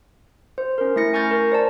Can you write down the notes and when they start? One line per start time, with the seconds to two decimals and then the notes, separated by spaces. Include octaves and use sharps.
0.58 C5
0.78 C#4 A#4
0.96 A3 E4 A#6 C#7
1.14 G#5 C#6 F6 G6 A6 A#6
1.31 A#4
1.52 C5 D5 A5